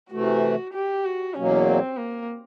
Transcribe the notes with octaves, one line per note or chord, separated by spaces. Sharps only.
C3 E3 A3 F#4
G4
F#4
E2 B2 F#3 A#3 C#4
C4
A#3